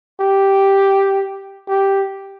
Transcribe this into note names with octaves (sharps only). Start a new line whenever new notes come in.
G4
G4